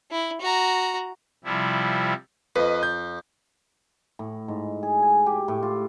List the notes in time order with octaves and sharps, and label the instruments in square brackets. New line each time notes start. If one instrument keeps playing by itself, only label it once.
[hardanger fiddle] E4
F#4 A#5
[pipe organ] C3 F3 G3 E4
[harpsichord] F2 [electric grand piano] B4 D#5
[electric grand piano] G6
[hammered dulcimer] A2
G#2
G#4
G#5
G4
A2
F4